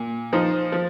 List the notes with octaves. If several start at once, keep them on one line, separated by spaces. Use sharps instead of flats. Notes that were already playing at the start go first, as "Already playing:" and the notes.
Already playing: A#2
F3 D#4 C5
F3